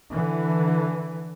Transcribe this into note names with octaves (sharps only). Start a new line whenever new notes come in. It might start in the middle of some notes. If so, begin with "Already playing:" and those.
D3 E3